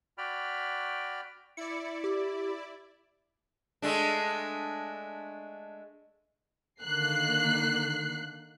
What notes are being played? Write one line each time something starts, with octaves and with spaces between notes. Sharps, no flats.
F#4 D5 G5 B5 F6
E4 D5 C#7
G4
G#3 A3 D4
D3 D#3 A#3 F#6 C7